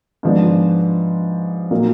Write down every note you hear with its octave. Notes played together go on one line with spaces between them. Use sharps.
G#2 F3 B3 D4
A#2 F#3 A#3 D#4